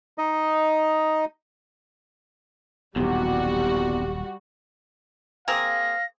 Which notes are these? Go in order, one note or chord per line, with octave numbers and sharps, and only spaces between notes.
D#4 D#5
D#1 B1 E2 C3 G3 F#4 G4
A#3 C4 G#4 F5 A#6